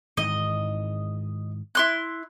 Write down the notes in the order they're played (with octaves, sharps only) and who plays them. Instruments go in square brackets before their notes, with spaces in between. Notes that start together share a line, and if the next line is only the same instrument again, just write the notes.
[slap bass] G#2 D#3 E3 [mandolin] D#5
[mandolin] E4 C6 F#6